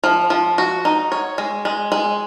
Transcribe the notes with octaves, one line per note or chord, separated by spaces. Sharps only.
F3
F3
F#4
D#4
C#5
G#3
G#3
G#3